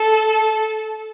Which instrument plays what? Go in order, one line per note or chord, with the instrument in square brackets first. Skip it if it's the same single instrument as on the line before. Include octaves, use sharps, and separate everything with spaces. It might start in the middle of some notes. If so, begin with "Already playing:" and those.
Already playing: [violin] A4